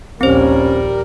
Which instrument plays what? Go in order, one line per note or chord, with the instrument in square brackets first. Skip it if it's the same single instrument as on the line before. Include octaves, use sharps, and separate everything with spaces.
[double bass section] A#1 D#2 [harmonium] G3 A#4 [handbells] C4 C5 [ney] C#4